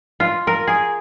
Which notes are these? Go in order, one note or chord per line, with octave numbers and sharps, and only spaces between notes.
F4
A#4
G#4